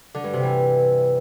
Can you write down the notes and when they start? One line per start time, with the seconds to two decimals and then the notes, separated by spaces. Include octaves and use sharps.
0.14 D3
0.24 G2
0.33 C3
0.43 E3